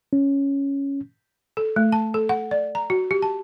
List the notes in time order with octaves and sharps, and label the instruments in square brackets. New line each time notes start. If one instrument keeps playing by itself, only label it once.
[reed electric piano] C#4
[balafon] A4
A3
A5
A4
F#5
D5
A#5
F#4
G4
A5